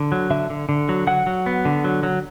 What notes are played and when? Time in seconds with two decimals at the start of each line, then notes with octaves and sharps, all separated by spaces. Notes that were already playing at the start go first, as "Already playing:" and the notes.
Already playing: D3
0.12 F#3
0.30 D3 E5
0.50 D3
0.69 D3
0.89 F#3
1.07 F#3 F#5
1.27 F#3
1.46 B3
1.65 D3
1.84 F#3
2.03 F#3